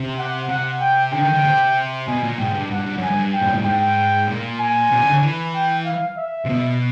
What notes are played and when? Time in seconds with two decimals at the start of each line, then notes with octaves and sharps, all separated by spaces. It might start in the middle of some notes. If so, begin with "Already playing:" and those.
Already playing: C3
0.18 F#5
0.50 C3 F#5
0.81 G5
1.13 D3 G5
1.24 D#3
1.34 D3
1.45 C3
2.07 B2 G#5
2.23 A#2
2.39 G#2 G5
2.54 G2
2.71 G2 F#5
2.86 G2
2.98 F#2 G#5
3.11 G2
3.33 G5
3.42 A#2
3.53 A2
3.64 G#2 G5
4.28 A#2
4.60 G#5
4.92 C3
5.02 D3
5.13 D3
5.22 E3
5.55 G5
5.86 F5
6.18 E5
6.45 C3
6.49 B2